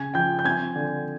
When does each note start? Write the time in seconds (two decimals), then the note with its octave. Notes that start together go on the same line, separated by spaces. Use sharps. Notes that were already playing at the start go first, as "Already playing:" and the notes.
Already playing: C#3 G#5 G#6
0.14 F3 G5 G6
0.39 G6
0.44 C4 G#5 G#6
0.76 D3